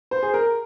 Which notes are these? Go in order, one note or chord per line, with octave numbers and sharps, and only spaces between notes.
C5
G#4
A#4